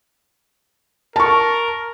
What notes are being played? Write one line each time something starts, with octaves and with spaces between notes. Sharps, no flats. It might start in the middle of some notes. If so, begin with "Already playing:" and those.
A#4 A5 C#6